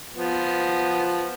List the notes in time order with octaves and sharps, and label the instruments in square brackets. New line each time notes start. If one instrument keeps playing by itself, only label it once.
[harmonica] F3 B3